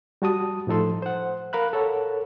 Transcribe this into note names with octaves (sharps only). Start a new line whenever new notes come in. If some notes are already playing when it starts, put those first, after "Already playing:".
G3 F#4 A5 D#6
A2 F3 D#4 A4 C6
C5 F#5
A#4 F5 B5 F#6
A4 A#4 C#5 F#5